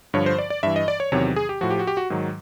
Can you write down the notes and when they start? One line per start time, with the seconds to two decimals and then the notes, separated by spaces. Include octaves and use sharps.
0.14 G2 D3 F3 C#5
0.26 C5
0.38 D5
0.50 D5
0.63 G2 E3 E5
0.76 D#5
0.88 D5
1.00 C#5
1.12 E2 C3 D#3 F#3 C#5
1.36 G#4
1.49 G4
1.61 A2 F3 F#4
1.71 G4
1.79 F#4
1.87 G4
1.97 F#4
2.10 G#2 D#3 F#3